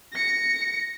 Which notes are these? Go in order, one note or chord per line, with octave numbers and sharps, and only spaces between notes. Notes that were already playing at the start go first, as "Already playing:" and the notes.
A#6 C#7